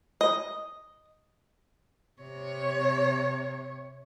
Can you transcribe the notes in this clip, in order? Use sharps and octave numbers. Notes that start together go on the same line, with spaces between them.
D#5
C3 C#5